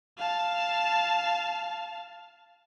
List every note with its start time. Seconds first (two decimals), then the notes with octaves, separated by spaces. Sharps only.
0.18 F5 A5